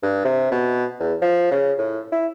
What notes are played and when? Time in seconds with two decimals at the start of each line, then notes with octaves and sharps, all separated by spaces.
0.02 G2
0.25 C3
0.51 B2
1.00 E2
1.21 F3
1.51 C#3
1.78 A2
2.12 E4